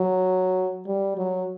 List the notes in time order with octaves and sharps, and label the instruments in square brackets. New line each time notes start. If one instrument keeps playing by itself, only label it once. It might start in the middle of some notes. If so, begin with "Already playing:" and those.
Already playing: [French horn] F#3
G3
F#3